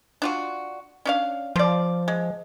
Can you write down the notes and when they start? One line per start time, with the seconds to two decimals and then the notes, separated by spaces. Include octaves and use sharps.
0.22 D4 F4 F#4
1.05 C#4 D4 F5
1.56 F3 C5 D5
2.08 G#3